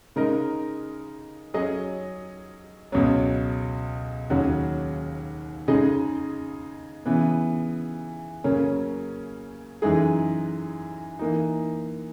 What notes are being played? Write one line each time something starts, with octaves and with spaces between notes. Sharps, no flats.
C#3 G#3 D#4 A#4 D#5
F#3 C#4 G#4 D#5
C#2 B2 F#3 C#4
D#2 C#3 F#3 C#4 F#4
C#3 G#3 D#4 G#4 D#5
C#3 E3 B3
C#3 F#3 A#3 C#4
F#2 E3 G#3 D#4 G#4
E3 A#3 D#4